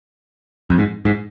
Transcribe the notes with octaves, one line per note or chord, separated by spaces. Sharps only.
F2
G#2
G#2